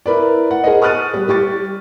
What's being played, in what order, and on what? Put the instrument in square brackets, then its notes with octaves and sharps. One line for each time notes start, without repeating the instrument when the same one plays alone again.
[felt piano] E4 A#4 B4 D5
F#5
G#4 A#4 C5 D#5
C#6 D#6 F6 F#6 A6 D#7
G3
G3 G4 C#6 A6